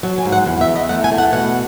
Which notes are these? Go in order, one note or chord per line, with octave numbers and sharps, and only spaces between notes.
F#3 A5
G#5
G#2
F#5
E2
E5
E2
D#5
A3 F#5
G#5
A3
F#5
B2 F#5